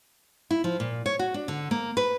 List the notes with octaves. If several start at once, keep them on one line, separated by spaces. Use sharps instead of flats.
E4
F3
A#2
C#5
F#4
D4
D3
A#3
B4